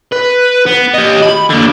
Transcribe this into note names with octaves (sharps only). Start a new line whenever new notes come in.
B4
B3
G4 D#5
B5
D3 A#3